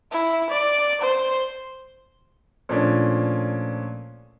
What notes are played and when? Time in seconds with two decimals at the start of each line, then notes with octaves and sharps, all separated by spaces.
0.12 E4
0.50 D5
1.01 C5
2.69 A#2 F3 A3 C#4 D4